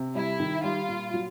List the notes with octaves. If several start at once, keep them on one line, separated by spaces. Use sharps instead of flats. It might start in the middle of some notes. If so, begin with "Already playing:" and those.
Already playing: C3
G3 E4
D#3
G3 F4
A#2
F#3